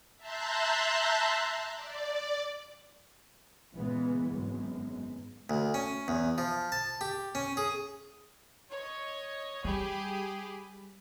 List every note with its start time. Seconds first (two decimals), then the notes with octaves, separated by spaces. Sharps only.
0.18 E5 A5 A#5 C6 F#6 G6
1.76 D5
3.75 A#2 C#3 E3 G#3 B3
4.28 G#1 F#2 G#3 B3
5.50 D2
5.74 C#4
6.08 E2
6.38 F3
6.72 A5
7.01 G4
7.35 C#4
7.57 G#4
8.72 C#5 D#5
9.64 G3 G4 G#4 B5